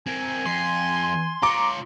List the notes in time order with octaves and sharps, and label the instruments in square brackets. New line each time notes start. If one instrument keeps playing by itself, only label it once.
[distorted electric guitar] C4 A#4 [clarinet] G#5
[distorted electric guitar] F2 [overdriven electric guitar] C6
[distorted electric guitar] F4 C#5 [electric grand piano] A#5 D6